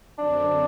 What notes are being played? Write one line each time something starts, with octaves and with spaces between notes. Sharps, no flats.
F#2 D3 F#3 C4 D4